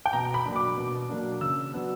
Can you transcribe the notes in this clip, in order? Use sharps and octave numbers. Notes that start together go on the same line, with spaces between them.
G5
B2 A#5
B5
F#3 A#3 D4
D6
B2
F#3 A#3 D4
C#3 E6
F#3 B3 D4